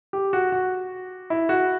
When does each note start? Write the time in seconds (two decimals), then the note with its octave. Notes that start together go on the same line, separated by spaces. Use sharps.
0.13 G4
0.33 F#4
0.52 F#4
1.30 E4
1.49 F#4